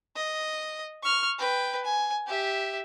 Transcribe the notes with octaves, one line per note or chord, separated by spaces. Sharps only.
D#5
C#6 F6
B4 G5
G#5
G4 E5